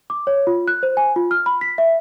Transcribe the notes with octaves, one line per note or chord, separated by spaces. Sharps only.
D6
C#5
F4
F#6
C5
G#5
F4
F6
B5
B6
E5